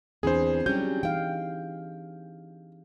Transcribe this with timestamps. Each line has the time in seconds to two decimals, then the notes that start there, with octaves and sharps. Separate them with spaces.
0.23 E2 E3 C4 D4 G#4 C5
0.66 F#3 G3 C#4 G4 G#4 G6
1.03 E3 D#4 F5 G5